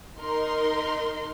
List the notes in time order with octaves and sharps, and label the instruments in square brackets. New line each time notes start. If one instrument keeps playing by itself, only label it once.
[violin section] D#4 A#4 C6